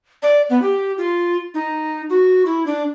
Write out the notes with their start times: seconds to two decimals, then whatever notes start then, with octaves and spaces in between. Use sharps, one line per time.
0.23 D5
0.49 B3
0.62 G4
0.98 F4
1.54 D#4
2.10 F#4
2.46 E4
2.66 D4